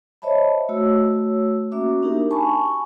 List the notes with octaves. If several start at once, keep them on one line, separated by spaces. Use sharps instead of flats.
C5 C#5 D#5 E5 A5 B5
A3 F#4 C#5 E6
A#3 C#4 F#4 E5 D6
D4 D#4 G4 A#4
G#5 A5 B5 C#6